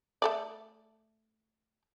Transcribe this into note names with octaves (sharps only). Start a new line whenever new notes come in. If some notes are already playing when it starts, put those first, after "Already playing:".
A3 A4 D5